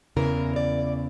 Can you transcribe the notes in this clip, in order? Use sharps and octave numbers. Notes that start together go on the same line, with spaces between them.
E2 C#3 E3 A#4
D5